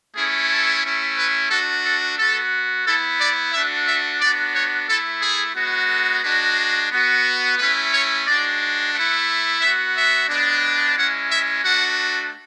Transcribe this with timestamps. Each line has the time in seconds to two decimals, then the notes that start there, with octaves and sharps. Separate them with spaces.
0.15 A3 C#4 E4 G#4
0.50 A4
0.82 A3 C#4 E4
1.16 B4
1.50 A3 D4 F#4 A4
1.84 A4
2.18 B3 F#4 A4
2.85 B3 E4 A4
3.19 D5
3.53 A3 D4 F#4 E5
3.87 E5
4.21 B3 D4 F#4 D5
4.54 C#5
4.88 A3 E4 A4
5.22 G#4
5.55 G#3 B3 F#4
5.90 A4
6.23 G#3 D4 F#4 B4
6.91 B3 F#4
7.58 A3 C#4 E4 B4
7.92 C#5
8.26 G#3 D4 F#4 D5
8.94 A3 E4 F#5
9.61 B3 F#4 E5
9.96 E5
10.29 G#3 B3 D4
10.96 G#3 C#4 E4 F#5
11.30 E5
11.64 A3 D4 F#4 F#5